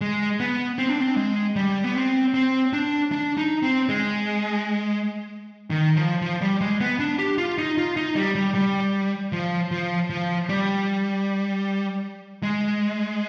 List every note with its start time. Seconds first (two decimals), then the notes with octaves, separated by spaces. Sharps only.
0.01 G#3
0.40 B3
0.78 C4
0.89 D4
1.01 C4
1.17 G#3
1.56 G3
1.84 B3
1.96 C4
2.34 C4
2.73 D4
3.12 D4
3.37 D#4
3.63 C4
3.89 G#3
5.70 D#3
5.96 F3
6.22 F3
6.41 G3
6.61 G#3
6.81 B3
7.00 D4
7.19 G4
7.38 F4
7.58 D#4
7.78 F4
7.97 D#4
8.16 G3
8.35 G3
8.55 G3
9.32 F3
9.71 F3
10.10 F3
10.49 G3
12.43 G#3